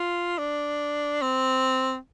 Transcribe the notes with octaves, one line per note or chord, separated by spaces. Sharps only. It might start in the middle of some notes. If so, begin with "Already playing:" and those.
Already playing: F4
D4
C4